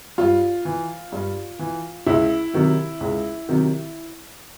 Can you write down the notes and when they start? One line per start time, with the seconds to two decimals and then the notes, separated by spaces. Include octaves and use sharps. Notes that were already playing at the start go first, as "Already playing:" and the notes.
0.18 G2 F4
0.65 E3
1.12 G2
1.59 E3
2.06 C#2 E4
2.54 C3 D#3 F#3
3.01 C#2
3.48 C3 D#3 F#3